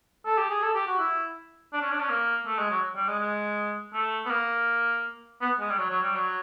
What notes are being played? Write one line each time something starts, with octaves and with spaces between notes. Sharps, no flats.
A4
G4
G#4
A4
G4
F#4
E4
D4
C#4
D4
C#4
A#3
A3
G#3
F#3
G3
G#3
G#3
A3
B3
A#3
B3
G#3
G3
F#3
F#3
G3
F#3